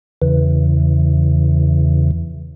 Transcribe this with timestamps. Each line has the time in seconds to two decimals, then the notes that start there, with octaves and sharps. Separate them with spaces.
0.22 E2 C#3 E3